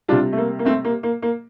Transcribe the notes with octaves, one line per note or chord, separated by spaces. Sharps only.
C3 G3 D4 F4
A3
A#3
A#3
A3 C4
A#3
A#3
A#3